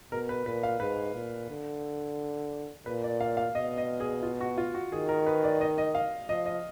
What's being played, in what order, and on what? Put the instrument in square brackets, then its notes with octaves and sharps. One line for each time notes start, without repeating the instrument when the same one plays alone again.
[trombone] B2 [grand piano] A#4
[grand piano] B4
[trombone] A#2 [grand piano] B4
[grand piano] F5
[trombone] G#2 [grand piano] B4
[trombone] A#2
D3
[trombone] A#2 [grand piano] B4
[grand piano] D5
F5
F5
[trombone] B2 [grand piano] D#5
[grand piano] D#5
G#4
F4
F#4
F4
F#4
[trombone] D#3 [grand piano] G#4
[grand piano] A#4
B4
D5
D#5
D#5
F5
[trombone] F3 [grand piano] D#5
[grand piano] D#5